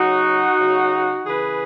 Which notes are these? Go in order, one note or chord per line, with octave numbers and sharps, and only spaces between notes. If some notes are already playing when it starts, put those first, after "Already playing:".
Already playing: C#3 F#3 D#4 F#4
C#3 F#3
C#3 E3 G#4 B4